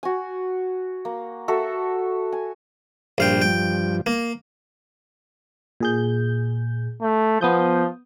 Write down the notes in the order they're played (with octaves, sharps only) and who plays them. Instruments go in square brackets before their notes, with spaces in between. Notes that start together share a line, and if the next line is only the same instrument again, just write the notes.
[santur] F#4 G#5
A#3
F#4 A4 E5
G#5
[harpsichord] A#1 F5 G5 [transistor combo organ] G2 F3
[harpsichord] G5
A#3
[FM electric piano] A#2 G#4 G6
[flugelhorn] A3
[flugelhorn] F3 [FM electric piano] B3 D#6 G6